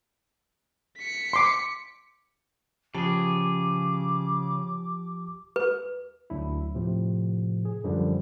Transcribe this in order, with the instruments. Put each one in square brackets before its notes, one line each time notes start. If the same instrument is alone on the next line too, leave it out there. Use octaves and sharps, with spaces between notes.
[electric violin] B6 C#7
[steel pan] C6 D6
[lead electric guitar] C#3 G#4 [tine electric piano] F3 G4 A5 [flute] D6
[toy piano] B4
[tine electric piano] D2 F#3 D4 E4
A2 C3 F3
G#4
F#2 D3 F3 G3